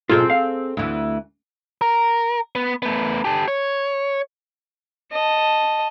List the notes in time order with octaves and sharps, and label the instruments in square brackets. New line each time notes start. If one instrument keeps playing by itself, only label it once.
[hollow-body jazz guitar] B1 F4 [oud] C4 G#4 A4
[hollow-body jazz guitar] F5
[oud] D2 E3
[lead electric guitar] A#4
B3
A3 B3
G4 A4
C#5
[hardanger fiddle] D#5 A5